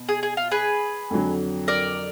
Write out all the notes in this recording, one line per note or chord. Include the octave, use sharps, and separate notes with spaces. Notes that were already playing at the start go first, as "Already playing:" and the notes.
Already playing: B2
G#4
G#4
F4
G#4 B4
F2 D3 F#3
A#4 D5